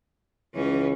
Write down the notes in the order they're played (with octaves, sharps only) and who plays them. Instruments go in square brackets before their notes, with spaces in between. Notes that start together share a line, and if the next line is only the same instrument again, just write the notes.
[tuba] C#2 [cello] E3 C#4